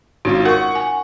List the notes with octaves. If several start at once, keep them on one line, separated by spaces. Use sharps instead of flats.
G#1 C#4 D#4 F4 F#4
A#4 F#5 C#6
G#5